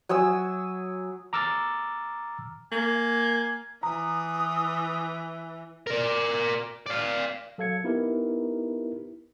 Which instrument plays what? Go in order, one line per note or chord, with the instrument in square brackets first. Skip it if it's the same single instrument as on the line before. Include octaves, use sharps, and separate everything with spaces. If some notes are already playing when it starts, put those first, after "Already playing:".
[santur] F#3 G#5 D#6 E6
[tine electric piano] A#5 D6 E6 F6 A6
[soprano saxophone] A#3 [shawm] G#5
[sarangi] E3 [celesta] A#5 [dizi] D#6
[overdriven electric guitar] A#4 D5
D5 F5
[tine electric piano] F#3 A4 F5 G#6 C#7
B3 D#4 E4 G4 A#4 B4